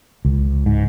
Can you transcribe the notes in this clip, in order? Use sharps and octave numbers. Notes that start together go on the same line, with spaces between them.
C#2
G#2